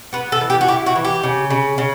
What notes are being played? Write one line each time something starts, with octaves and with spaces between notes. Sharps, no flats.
B3 B4
A4
E3
G4
F#4
E4 G4
F#4
E3
G4
C#3
C#3
C#3